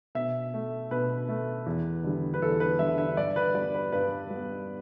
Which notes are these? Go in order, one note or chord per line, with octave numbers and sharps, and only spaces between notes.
B2 E5
A3
B2 B4
A3
E2
D3 G3
B4
E2 A4
B4
D3 G3 E5
E5
G2 D5
B4
G3 B3 D5
B4
G2 B4
G3 B3